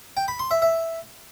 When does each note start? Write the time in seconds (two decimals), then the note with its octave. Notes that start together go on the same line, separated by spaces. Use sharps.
0.17 G5
0.28 B5
0.39 C6
0.51 E5
0.62 E5